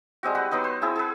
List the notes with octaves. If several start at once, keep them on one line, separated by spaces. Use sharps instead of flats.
G3 G#3 C4 F#4
G4 B4 F#5
F#3 B3 D#4 B4
C5
C4 E4 G#4 B5
G#4 B4